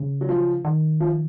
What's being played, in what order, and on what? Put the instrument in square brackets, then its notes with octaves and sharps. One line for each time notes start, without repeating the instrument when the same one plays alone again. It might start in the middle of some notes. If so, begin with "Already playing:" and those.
Already playing: [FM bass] C#3
[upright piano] F#3
F3
[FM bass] D#3
[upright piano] F3